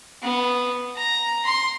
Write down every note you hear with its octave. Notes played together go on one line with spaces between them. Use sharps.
B3
A#5
C6